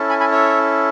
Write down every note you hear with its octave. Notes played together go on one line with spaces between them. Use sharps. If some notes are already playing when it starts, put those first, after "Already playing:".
Already playing: C#4 E4 A4
G#5 B5
G#5 B5
C#5 E5